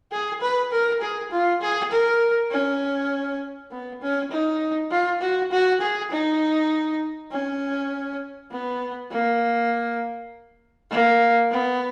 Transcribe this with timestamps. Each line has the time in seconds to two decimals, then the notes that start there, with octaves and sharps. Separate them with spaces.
0.12 G#4
0.41 B4
0.72 A#4
1.01 G#4
1.31 F4
1.61 G#4
1.91 A#4
2.51 C#4
3.71 B3
4.02 C#4
4.31 D#4
4.91 F4
5.21 F#4
5.52 F#4
5.81 G#4
6.11 D#4
7.31 C#4
8.51 B3
9.11 A#3
10.90 A#3
11.51 B3